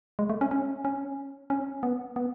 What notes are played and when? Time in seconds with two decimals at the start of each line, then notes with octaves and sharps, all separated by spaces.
0.19 G#3
0.30 A3
0.41 C#4
0.51 C#4
0.85 C#4
1.50 C#4
1.83 B3
2.16 B3